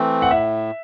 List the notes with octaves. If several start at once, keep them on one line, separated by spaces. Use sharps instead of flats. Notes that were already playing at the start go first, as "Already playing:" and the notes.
Already playing: E3 A3 C4
F#5
A2 E5